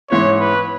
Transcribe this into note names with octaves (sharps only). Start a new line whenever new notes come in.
G#2 E3 C#4 C#5
B4